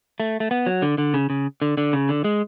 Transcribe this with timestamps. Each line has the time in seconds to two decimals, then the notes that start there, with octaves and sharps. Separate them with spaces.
0.20 A3
0.40 A3
0.51 B3
0.66 F#3
0.82 D3
0.98 D3
1.14 C#3
1.30 C#3
1.62 D3
1.77 D3
1.93 C#3
2.09 D3
2.24 G#3